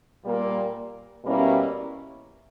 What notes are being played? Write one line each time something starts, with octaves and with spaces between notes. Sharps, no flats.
A#2 G3 A#3
B2 G3 A#3 C#4 E4